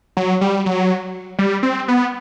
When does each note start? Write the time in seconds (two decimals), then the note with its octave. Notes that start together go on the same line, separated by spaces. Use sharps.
0.17 F#3
0.41 G3
0.66 F#3
1.39 G3
1.63 C4
1.88 B3